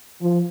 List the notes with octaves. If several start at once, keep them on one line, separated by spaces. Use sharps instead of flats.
F3